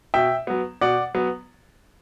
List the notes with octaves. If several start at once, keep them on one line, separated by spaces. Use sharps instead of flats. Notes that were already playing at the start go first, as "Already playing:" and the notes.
B2 E5 G5
F#3 B3
B2 D5 F#5
F#3 B3